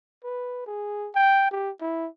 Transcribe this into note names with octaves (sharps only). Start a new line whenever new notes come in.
B4
G#4
G5
G4
E4